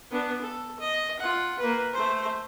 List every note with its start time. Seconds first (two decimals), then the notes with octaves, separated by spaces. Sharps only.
0.11 B3 D4
0.41 A4
0.80 D#5
1.19 F4 F#5
1.59 A#3 B4
1.93 A3 C5